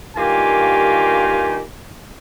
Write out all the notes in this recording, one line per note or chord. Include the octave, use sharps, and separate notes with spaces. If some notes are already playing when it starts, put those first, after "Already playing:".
G2 D#3 A#3 F4 G4 G#5